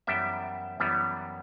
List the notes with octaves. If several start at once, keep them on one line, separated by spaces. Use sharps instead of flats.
F#2 E3 G3 B3 E5 G5
F#2 E3 G3 B3